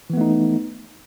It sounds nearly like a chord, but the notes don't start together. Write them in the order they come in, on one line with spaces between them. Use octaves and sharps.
E3 B3 A3 D#4